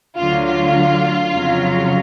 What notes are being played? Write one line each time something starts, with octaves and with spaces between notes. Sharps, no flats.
D2 D3 F#3 F4
F4
F2 C#3 F#3